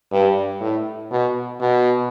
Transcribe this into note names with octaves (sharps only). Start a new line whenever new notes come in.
G2
A2
B2
B2